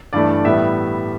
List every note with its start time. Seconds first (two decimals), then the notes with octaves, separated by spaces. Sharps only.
0.13 G2 E3 A3 D5
0.44 A2 G3 B3 E5